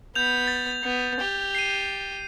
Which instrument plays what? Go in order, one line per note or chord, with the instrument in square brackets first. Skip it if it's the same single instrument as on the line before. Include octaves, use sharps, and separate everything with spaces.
[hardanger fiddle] B3 B5 [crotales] G6 F7
[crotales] A6
[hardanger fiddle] B3
G4
[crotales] C7 D#7